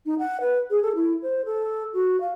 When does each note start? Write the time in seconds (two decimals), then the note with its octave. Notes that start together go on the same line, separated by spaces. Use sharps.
0.06 D#4
0.19 F#5
0.41 B4
0.70 G#4
0.83 A4
0.95 E4
1.23 C5
1.45 A4
1.94 F#4
2.21 F5